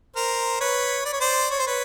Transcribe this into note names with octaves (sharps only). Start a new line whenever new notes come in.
A#4 C5
B4 C#5
D5
C#5
C5 D5
C#5
C5
B4 C#5